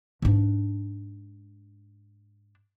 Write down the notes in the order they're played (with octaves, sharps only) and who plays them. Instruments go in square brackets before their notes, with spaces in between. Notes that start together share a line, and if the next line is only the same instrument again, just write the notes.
[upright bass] G#2 D4